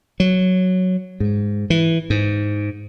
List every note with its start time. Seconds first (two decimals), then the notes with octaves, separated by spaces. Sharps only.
0.20 F#3
1.20 G#2
1.70 E3
2.10 G#2